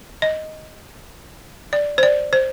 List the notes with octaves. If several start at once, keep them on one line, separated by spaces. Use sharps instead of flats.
D#5
D5
C5
D5
C5